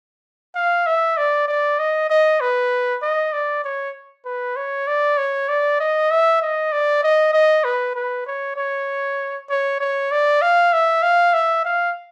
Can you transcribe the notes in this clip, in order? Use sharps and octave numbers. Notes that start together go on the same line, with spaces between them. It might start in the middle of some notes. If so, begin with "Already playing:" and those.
F5
E5
D5
D5
D#5
D#5
B4
D#5
D5
C#5
B4
C#5
D5
C#5
D5
D#5
E5
D#5
D5
D#5
D#5
B4
B4
C#5
C#5
C#5
C#5
D5
F5
E5
F5
E5
F5